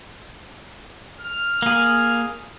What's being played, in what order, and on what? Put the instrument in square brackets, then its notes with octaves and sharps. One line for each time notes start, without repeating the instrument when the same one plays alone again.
[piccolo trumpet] F6
[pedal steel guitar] A#3 G#4